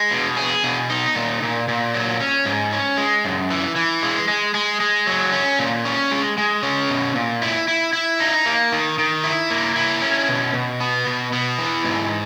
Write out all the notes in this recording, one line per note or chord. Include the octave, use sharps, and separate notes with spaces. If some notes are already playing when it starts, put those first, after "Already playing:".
Already playing: G#3
B2
G#4
B2
D#4
A#2
A#2
A#2
F#3
C#4
G#2
C#4
G#3
F#2
E3
E3
G#3
G#3
G#3
G#3
F#3
C#4
A#2
C#4
G#3
G#3
C#4
B2
A#2
E4
E4
E4
D#4
A#3
D#3
D#3
E4
A#3
E4
C#4
B2
B2
B3
B2
B3
E3
G#2